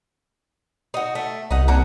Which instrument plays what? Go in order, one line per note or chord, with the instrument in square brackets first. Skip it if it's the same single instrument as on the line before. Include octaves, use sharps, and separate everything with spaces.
[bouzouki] D#4 F#4
A3
[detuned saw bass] C2 [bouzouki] D#4 F#5
[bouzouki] A#3 D4 F#4